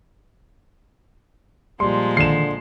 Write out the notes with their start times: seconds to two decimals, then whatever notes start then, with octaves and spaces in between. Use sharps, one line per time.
1.80 A#2 F3 G3 G#3 C6
2.17 D3 D#3 C7 E7